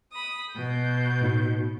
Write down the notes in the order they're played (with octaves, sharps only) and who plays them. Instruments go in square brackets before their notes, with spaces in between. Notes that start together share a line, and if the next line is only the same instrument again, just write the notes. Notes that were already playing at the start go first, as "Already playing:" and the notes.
[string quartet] B5 D#6
B2 G6
[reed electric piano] A2 D#4 F#4